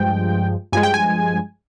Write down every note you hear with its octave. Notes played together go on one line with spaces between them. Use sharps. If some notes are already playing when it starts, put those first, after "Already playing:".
Already playing: G2 F3 G#3 G5
G2 F3 G#3 G#5
G5
G#5